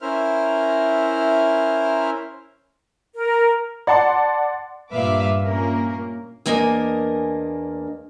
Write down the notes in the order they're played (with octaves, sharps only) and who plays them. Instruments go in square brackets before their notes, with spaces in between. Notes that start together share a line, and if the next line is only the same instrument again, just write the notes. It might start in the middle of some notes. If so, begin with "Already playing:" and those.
[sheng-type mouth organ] C#4 E4 A#4 C5 E5 F6
[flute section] A#4
[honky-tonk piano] D5 F#5 A5 C6
[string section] G2 A#2 B4 E5 F5 D6
A#2 A#3 C#4 A#4
[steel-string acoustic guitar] E2 A#3 D4 A#4 D#5 G#5